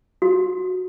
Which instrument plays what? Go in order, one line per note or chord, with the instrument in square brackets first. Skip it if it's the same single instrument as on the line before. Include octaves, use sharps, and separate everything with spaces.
[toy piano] F#4